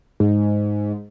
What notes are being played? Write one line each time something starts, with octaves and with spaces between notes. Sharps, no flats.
G#2